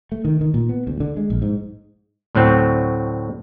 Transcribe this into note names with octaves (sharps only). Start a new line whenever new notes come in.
A3
D#3
D#3
A#2
B3
D2
D3
G#3
A#1
G#2
D2 A2 F#3 C4